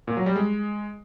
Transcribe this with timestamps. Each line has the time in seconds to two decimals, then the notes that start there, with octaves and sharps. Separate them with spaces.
0.07 A#2
0.17 F#3
0.26 G3
0.36 G#3